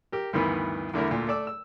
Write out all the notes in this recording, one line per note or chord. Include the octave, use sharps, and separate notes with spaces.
G4 A#4
D2 G2 D#3 E3 B3
E2 D3 A3 E4 A#4
D2 A#2 A3
A3 D5 D6 E6
E6